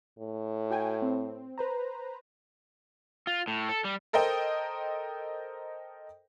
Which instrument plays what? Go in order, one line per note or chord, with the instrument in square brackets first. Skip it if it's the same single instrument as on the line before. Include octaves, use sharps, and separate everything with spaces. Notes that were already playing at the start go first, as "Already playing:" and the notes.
[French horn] A2
[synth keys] F#4 G5 G#5
C4
B4 C5 A#5
[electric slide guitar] F4
A2
A4
G3
[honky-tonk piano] A4 A#4 C5 D#5 G5